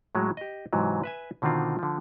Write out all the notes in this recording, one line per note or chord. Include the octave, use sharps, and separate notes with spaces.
A2 F#3 G#3 C#4
G4 D#5
G#2 C3 E3 F#3
B4 E5 G#5
B2 D3 D#3 C4 F4
D3 F3